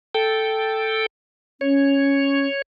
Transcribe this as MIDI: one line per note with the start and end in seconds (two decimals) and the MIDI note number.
0.15 1.06 69
0.15 1.06 79
1.61 2.47 61
1.61 2.62 73